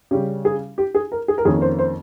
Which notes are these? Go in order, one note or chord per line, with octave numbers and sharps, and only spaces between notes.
C#3 G3 C#4 G4
G#4
G4
G#4
A#4
G#4
A#4
F2 D#3 A#3 C#4 G#4
C5
C5